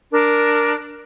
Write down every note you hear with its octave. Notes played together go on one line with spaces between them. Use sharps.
D4 A#4